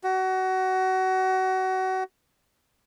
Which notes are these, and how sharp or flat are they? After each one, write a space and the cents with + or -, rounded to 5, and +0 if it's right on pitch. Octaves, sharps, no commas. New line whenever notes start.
F#4 +25